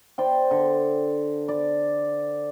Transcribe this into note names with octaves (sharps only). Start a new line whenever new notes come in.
C5 D5 G5
D3
D5